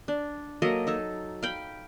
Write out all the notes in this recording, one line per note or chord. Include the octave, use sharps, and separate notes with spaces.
D4
F#3 A#3 A4 D#5
D#4 A4 C#5
F5 G5 B5